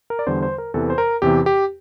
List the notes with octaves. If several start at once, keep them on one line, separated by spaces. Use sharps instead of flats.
A#4
D5
E2 D3 G3 C5
C5
A#4
E2 C3 E3 A4
C5
A#4
E2 C3 E3 G4
G4